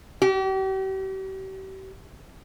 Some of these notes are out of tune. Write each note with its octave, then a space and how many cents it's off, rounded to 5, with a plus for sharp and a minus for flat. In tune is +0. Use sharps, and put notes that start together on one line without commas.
G4 -40